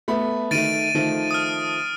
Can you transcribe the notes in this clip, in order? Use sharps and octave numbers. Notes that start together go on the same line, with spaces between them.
A3 B3 B5
D#3 A3 A6 D7 D#7
D#3 F3 A3
D#6 F6